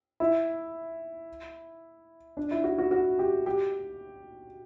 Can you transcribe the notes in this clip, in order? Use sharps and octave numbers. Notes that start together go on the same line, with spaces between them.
E4
D4
E4
F#4
F#4
F#4
G4
G4